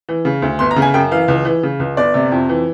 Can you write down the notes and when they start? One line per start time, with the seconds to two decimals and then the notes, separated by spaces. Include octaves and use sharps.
0.09 E3
0.25 C#3
0.42 D2
0.59 G1 C6
0.71 A#5
0.76 C#3
0.82 G#5
0.94 F#2 G5
1.11 E3 F5
1.28 C#2
1.45 E3
1.63 C#3
1.80 C#2
1.97 G1 D5
2.14 C3
2.32 F2
2.49 E3